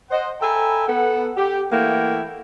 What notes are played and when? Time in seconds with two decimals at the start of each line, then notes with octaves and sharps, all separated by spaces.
0.11 C5 D#5 F#5
0.41 A4 E5 G5 G#5 A#5 B5
0.87 B3 A4 F#5
1.37 G4
1.71 E3 A3 A#3 E4 F#5 G5